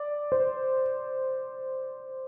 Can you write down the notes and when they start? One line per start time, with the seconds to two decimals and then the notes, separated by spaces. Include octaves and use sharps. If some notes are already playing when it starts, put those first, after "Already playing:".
Already playing: D5
0.32 C5